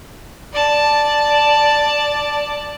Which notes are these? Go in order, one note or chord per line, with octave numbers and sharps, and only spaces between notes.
D5 A5